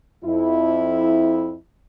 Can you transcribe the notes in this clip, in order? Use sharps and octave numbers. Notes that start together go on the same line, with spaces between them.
F2 E4